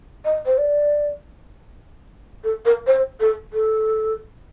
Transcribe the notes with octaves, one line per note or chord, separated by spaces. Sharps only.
D#5
C5
D5
A4
A#4
C5
A4
A4